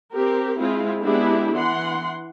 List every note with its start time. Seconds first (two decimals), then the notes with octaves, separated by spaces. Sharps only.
0.13 C4 G4 A#4
0.58 G#3 C4 E4 F4
1.02 G#3 B3 D4 E4 G4
1.54 E3 F#5 C6